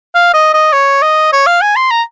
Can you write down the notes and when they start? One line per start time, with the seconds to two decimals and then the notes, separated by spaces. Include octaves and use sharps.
0.15 F5
0.34 D#5
0.54 D#5
0.73 C#5
1.02 D#5
1.33 C#5
1.46 F5
1.61 G#5
1.76 C6
1.91 A#5